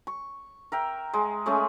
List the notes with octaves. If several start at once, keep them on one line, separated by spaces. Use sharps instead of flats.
C#6
A#4 E5 G5
G#3
G#3 A3 C#4 D#5